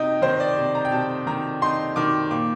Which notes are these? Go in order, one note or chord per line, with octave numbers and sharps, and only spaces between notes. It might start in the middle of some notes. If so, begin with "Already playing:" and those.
Already playing: C3 D#4 D#5 G5
D#3 C5
D5
C3
A#5
G5
C3 A5
D#3 A#5
D#4 C6
D#3 D6
A#2 D6